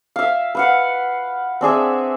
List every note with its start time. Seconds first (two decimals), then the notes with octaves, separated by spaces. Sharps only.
0.16 E5 F5
0.55 B4 F5 F#5
1.61 C4 D4 G#4 E5